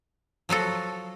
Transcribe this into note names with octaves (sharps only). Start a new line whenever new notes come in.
F3 F#3 F#4 A4